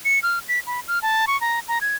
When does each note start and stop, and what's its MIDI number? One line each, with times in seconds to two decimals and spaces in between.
0.05 0.19 97
0.23 0.39 89
0.48 0.60 95
0.67 0.80 83
0.88 0.99 89
1.02 1.25 81
1.27 1.39 85
1.41 1.60 82
1.68 1.79 82
1.81 1.96 92